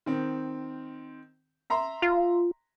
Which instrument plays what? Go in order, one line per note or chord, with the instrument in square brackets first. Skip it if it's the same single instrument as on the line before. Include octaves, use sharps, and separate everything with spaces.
[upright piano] D#3 C4
E5 A#5 C6
[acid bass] F4